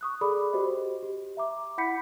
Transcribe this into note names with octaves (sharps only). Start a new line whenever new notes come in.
C#6 D#6 F#6
G#4 A4 D5 B5 D6
F#4 G4 C5 D#5
G4
E5 A#5 D6
E4 F#5 B5 G6 B6 C#7